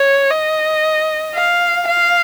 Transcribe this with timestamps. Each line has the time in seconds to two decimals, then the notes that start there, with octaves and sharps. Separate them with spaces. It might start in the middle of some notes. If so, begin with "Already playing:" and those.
Already playing: C#5
0.31 D#5
1.35 F5
1.87 F5